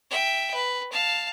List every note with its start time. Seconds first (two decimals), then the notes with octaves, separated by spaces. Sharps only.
0.10 E5 G5
0.54 B4
0.92 F5 A5